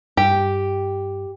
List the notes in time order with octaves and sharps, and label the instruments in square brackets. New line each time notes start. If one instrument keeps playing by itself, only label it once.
[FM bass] G2 [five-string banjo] G4